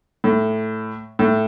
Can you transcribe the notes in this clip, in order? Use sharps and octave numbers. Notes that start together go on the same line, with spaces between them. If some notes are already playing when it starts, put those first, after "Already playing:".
A2
A2